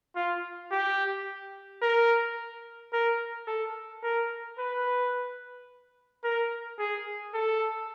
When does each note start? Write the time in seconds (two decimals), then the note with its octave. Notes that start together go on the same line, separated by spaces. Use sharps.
0.16 F4
0.71 G4
1.82 A#4
2.93 A#4
3.47 A4
4.03 A#4
4.58 B4
6.24 A#4
6.79 G#4
7.34 A4